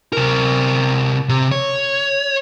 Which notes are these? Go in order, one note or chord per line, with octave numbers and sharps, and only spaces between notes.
C3 A#4
C3
C#5